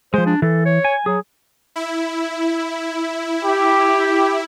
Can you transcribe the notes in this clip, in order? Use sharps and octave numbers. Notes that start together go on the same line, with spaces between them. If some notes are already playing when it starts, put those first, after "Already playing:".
F3 G#3 C5
D4
E3 A4
C#5
G#5
F#3 G#4
E4
G4